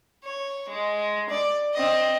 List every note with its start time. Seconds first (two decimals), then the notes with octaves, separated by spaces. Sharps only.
0.24 C#5
0.69 G#3
1.29 D5
1.74 C4 D#5